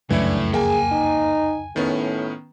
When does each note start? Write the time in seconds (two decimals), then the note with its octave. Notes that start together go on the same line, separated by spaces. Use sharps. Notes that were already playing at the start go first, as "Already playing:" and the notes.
0.10 F1 C#2 F#2 A2 E3 D4 E4
0.54 A#3 G#4 G5 G#5
0.92 D#4
1.76 A2 D#3 B3 C#4